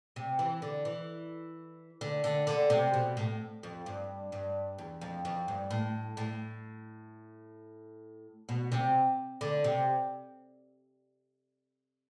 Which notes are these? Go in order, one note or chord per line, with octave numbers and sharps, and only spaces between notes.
C3
E3
D3
E3
D3
D3
D3
C3
B2
A2
F2
G2
G2
E2
F2
F2
G2
A2
A2
B2
C3
D3
C3